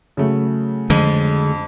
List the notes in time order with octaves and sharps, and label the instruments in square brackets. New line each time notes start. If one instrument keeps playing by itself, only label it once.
[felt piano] C#3 F#3 A3
[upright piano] F2 [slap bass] D3 G#3